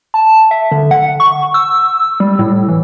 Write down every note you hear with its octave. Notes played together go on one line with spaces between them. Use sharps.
A5
E5
D3
F#5
C#6
E6
G3
A2
E3